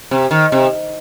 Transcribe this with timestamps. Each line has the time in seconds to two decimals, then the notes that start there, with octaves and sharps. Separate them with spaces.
0.11 C3
0.31 D#3
0.52 C3